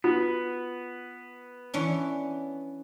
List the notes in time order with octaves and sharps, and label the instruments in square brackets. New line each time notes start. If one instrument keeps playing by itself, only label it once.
[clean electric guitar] B3 [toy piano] F4
[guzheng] E3 C#4 D4